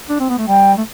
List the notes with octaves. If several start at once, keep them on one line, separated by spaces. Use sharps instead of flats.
D4
C4
B3
A3
G3 G5
A3